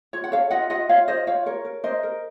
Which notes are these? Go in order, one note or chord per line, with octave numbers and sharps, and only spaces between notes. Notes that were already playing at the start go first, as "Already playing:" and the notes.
F4 C#5
F#5
A4 C#5 F5
F4 D#5 F#5
F4 D#5 F#5
F4 C#5 F5
F4 C5 D#5
F4 C#5 F5
A#4 C#5
A#4
A#4 C5 D#5
A#4